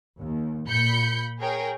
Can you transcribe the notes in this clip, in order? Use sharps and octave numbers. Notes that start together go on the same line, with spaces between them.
D#2
A#2 B5 G6 C#7
G#4 A#4 C#5 G5